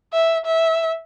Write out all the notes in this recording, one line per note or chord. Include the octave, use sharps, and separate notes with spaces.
E5
E5